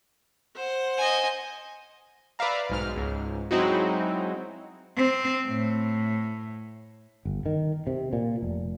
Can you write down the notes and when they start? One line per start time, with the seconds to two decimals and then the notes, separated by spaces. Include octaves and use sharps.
0.56 C5 F#5 C6
0.97 D#5 G#5
2.39 B4 D5 E5 F5 A#5
2.70 B1 G#2 F6
2.96 C#2 G#2
3.51 F#3 G#3 C4 D#4 E4 F#4
4.97 C4
5.47 A2
7.25 G1
7.46 D#3
7.87 C3
8.13 A#2
8.42 F1